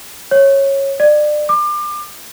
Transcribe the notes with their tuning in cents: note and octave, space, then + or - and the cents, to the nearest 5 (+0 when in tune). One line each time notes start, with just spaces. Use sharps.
C#5 -15
D5 +30
D6 +30